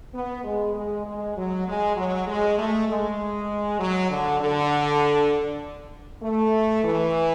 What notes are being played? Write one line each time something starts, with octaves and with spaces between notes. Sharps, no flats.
B3
G#3
G#3
G#3
F#3
G#3
F#3
G#3
A3
G#3
F#3
D3
D3
A3
E3